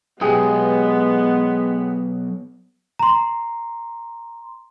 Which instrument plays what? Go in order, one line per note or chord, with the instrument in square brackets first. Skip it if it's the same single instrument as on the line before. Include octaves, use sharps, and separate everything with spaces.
[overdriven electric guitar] B1 [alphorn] G#3 [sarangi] B3 [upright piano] G4 G#4 D#6
[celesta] A#5 C6